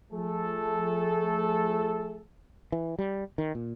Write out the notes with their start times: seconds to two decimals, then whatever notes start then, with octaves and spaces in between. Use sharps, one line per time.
0.13 F3 A3 G#4 A4
2.72 E3
2.99 G3
3.38 D#3
3.55 A#2